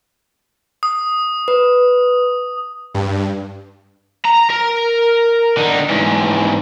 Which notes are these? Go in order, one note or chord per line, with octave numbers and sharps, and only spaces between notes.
D#6
B4
G2
A#5
A#4
D3 D#4
G#2 E3